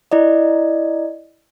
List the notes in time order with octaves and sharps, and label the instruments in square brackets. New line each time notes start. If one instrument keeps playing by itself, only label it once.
[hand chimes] E4 D5 D#5